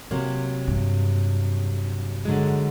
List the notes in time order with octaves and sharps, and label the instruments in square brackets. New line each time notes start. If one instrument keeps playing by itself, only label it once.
[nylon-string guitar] C3 F#3 A#3
[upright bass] G2
[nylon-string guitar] D3 F#3 G#3